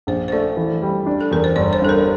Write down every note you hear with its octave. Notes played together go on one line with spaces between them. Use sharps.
A#1 C5
C5
A3 D5
E3
G3
D4
A4
E2 A#4
C5
G1 D5
C5
G2 A4
A#4